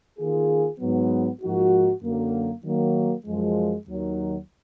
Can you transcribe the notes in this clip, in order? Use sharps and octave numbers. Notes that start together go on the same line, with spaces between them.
D#3 A#3 F4 G#4
G#2 F#3 B3
G#2 F3 A#3 D#4 F#4
F#2 D3 F#3 A#3
D#3 F#3 A#3
F#2 F3 G#3
D#2 D#3 F#3